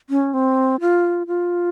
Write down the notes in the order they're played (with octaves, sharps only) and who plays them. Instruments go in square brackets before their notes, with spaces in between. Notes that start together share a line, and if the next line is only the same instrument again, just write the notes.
[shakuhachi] C#4
C4
F4
F4